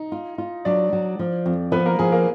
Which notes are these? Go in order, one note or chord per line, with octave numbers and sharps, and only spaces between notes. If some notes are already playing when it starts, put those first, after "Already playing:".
Already playing: D#4
F4
F4
F#3 D4 D5
F#3
F3
F2
F3 B3 B4
A#3 A#4
F3 G#4
A#3 A#4